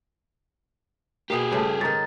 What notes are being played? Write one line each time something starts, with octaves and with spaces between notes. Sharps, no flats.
B2 A#3 G4 G#4
G2 C#3 A3
G#2 D#3 A#5 A6